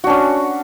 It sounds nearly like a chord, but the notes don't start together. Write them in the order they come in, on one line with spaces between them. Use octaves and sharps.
F#4 D4 C#4